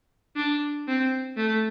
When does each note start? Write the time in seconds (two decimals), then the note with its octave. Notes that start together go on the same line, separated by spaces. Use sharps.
0.36 D4
0.87 C4
1.37 A3